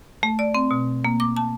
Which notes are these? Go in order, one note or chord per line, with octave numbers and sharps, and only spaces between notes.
A3
D5
C4
B2
A#3
D6
A5